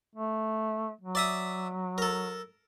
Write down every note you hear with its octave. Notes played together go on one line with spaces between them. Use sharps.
A3
F#3
D5 E5 D#6
A4 A#4